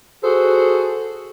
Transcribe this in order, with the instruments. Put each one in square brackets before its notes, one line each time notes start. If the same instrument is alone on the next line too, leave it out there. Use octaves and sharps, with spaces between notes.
[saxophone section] F#4 G#4 A4 C5